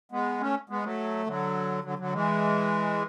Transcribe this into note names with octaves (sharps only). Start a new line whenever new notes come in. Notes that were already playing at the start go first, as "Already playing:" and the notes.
G#3 B3
A3 C#4
G#3 B3
F#3 A3
D3 F#3
D3 F#3
D3 F#3
E3 G#3